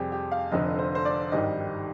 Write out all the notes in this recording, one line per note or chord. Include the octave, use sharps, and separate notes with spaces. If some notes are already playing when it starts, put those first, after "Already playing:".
Already playing: F2 C3 G3 G4 G#4
G4
F5
F1 F2 D3 D#5
C5
C5
D5
G#1 G2 D#3 G3 D#5